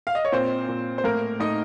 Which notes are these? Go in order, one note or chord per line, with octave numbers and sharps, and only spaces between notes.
F5
D#5
C#5
A#2 C4 C5
A#2
C5
A2 A#3 A#4
A2 D#4 D#5